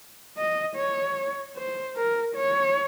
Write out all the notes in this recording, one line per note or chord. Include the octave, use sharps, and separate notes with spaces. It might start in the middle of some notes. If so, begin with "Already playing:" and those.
D#5
C#5
C5
A#4
C#5